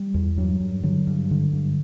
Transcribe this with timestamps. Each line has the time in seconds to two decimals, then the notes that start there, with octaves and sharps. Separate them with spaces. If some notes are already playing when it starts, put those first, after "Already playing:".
Already playing: G3
0.14 E2
0.38 G2 F#3
0.60 G2
0.83 D3 F#3
1.07 G2
1.31 D3
1.53 G2